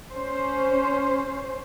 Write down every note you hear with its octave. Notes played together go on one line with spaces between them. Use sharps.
C#4 C5